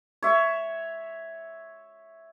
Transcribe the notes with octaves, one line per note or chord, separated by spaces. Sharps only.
C#5 E5